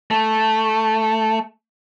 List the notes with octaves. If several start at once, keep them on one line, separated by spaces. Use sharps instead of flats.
A3